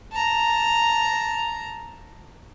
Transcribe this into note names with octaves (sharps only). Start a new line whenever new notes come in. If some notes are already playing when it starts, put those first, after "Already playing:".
A5 A#5